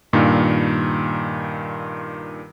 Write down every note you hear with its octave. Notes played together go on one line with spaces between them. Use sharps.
G2 A#2 D#3